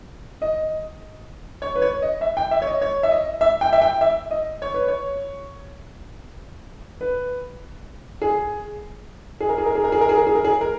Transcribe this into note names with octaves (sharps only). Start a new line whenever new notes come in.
D#5
C#5
B4
C#5
D#5
E5
G5
E5
C#5
D#5
C#5
E5
D#5
E5
G5
E5
G5
E5
D#5
C#5
B4
C#5
B4
G#4
G#4
A#4
G#4
A#4
G#4
A#4
G#4
A#4
G#4
A#4
G#4
A#4
G#4
A#4